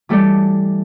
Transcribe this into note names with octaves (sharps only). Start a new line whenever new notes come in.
E3 G3 A3 A4 D5